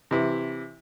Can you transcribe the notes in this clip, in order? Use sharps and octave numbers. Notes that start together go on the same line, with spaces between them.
C3 E3 E4